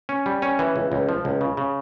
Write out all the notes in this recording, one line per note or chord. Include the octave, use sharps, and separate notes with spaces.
C#4
G3
C#4
E3
C#2
C#2
F3
C#2
C#3
C#3